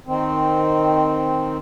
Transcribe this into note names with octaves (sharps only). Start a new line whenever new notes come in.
D#3 C4